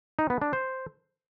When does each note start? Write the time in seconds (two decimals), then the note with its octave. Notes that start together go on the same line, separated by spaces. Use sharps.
0.19 D#4
0.30 B3
0.42 D4
0.53 C5